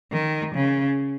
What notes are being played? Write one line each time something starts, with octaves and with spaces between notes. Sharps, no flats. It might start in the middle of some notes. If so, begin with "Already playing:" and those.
D#3
C#3